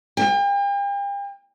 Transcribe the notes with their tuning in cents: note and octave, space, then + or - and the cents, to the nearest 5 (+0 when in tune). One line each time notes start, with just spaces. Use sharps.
G5 +40